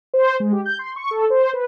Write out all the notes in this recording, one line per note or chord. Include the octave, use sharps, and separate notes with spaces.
C5
G#3
G4
G6
C6
C#6
A4
C5
B4